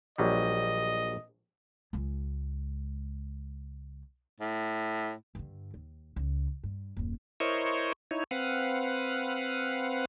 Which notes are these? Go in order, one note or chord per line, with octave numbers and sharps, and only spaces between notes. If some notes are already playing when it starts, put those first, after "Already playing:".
A#1 F#3 G3 D#5
C#2 G#3
A2
G2 D3
D#2
C#2
G2
D#1 F#2
E4 A#4 C5 C#5 D#5 C#6
D#4 E4 C#5
C4 B4 F5 F#5